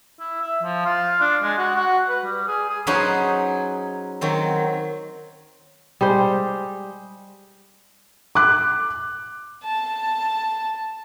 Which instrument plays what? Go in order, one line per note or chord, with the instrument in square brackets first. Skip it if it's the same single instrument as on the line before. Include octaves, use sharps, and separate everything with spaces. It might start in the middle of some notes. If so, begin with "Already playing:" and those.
[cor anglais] E4
E5
F3
F4
D4
G#3
F#4
F#4
B4
G3
G#4
G#4
[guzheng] F#3 C#4 D#4 G#4 B4 C5
D#3 F#3 C4
[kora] G3 G#3 C5
[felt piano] D6 F#6
[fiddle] A5